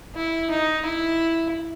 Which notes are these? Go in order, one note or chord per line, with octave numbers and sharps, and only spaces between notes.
E4
D#4
E4